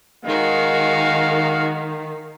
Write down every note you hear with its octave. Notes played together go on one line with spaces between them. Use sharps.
D#3 G#3 F#4 F5